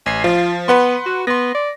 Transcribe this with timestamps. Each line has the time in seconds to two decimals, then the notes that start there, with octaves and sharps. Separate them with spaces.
0.06 A1 G#5 C7
0.24 F3 F4
0.68 B3 B4 F#5 C6
1.06 F#4
1.27 B3 C6 A#6
1.55 D5